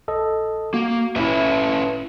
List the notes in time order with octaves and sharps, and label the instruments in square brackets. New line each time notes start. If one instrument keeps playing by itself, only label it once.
[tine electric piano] A#1 A4 D#5
[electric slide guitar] A#3 [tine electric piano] F#4
[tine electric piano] G1 E4 [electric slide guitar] C#4 B4 E5